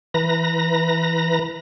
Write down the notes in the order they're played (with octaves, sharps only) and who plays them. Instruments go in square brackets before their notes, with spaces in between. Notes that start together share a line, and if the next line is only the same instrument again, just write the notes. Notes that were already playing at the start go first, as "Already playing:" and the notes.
[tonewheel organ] E3 B4 A#5 A#6